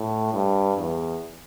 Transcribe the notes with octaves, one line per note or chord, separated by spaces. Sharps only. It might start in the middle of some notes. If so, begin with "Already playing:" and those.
Already playing: A2
G2
E2